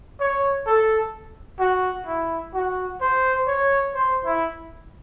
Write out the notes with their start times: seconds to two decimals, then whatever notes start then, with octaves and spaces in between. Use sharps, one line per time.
0.20 C#5
0.66 A4
1.60 F#4
2.07 E4
2.54 F#4
3.01 C5
3.47 C#5
3.94 C5
4.25 E4